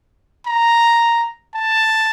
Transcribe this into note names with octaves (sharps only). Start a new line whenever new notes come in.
A#5
A5